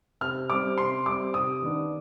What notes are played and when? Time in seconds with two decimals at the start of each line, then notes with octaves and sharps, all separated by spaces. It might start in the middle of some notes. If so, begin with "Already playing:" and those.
0.21 C3 F6
0.50 G3 C4 D6
0.78 C3 C6
1.06 G3 C4 D6
1.34 C3 D#6
1.62 D#3 B3 D4